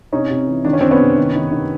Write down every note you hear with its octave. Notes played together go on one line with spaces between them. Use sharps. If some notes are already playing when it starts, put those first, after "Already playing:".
C3 C#4 D#4
C3
E3
D#3 D4
C#4
D#3 C4 D4
B3 C#4
C3
D#3
D#3
D#3